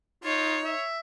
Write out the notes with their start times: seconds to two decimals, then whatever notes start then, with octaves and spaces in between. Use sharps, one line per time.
0.24 D#4 F4 C#5
0.64 E5